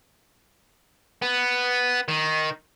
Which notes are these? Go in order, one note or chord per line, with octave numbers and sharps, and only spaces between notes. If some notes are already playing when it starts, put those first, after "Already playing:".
B3
D#3